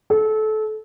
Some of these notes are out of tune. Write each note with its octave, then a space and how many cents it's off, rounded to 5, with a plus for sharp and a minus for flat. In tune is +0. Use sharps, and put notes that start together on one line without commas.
A4 -25